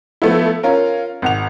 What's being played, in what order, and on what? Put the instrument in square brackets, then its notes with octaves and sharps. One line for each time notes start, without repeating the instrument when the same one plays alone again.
[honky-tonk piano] F3 A3 B3 E4
C#4 F4 A#4
G#1 F#5 F7